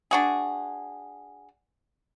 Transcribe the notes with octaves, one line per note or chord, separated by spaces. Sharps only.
D4 F#4 G#4